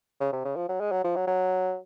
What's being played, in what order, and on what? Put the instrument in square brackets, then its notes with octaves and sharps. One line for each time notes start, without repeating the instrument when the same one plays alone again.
[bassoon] C#3
C3
C#3
F3
F#3
G#3
F#3
F3
F#3
F#3